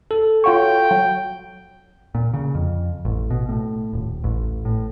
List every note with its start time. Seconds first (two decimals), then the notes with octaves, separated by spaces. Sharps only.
0.11 A4
0.44 F4 F#4 C#5 G5
0.91 F#3
2.15 A#2
2.34 C#3
2.55 F2
3.05 A1
3.30 B2
3.49 A2
3.93 D#1
4.24 A1
4.65 A2